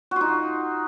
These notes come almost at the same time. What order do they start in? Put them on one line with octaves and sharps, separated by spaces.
F#4 F4 D#4